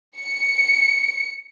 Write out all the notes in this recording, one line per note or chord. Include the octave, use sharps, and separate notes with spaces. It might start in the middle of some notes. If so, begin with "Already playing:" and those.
C#7